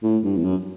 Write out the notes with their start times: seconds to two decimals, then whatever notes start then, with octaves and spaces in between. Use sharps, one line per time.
0.03 A2
0.24 G2
0.37 E2
0.45 F#2